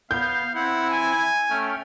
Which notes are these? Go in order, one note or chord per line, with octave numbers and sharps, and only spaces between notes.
B3 F5 G6
C4 E4 F#5
G#5
A3 C#4 G5 F6